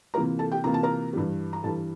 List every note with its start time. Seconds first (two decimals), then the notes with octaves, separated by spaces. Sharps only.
0.14 C3 E3 A#3 F4 A#4 A#5
0.39 A4 A5
0.52 G4 G5
0.64 C3 E3 A#3 F4 A#5
0.74 A5
0.83 A#4 A#5
1.13 G2 E3 G3
1.53 A#5
1.63 G2 E3 G3 A4 A5